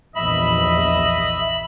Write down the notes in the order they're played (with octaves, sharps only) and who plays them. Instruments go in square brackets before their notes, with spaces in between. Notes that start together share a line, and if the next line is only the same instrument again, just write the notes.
[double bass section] A#1 E2 G2 [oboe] D#5 [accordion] E5 [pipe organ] B5